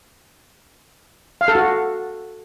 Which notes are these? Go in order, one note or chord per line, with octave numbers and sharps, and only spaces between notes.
F5
A4
F#4